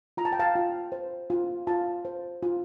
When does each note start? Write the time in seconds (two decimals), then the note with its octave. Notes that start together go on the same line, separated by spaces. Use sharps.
0.17 F4 A#5
0.25 A5
0.32 G5
0.39 F5 A5
0.56 F4
0.92 C5
1.30 F4
1.67 F4 F5 A5
2.05 C5
2.43 F4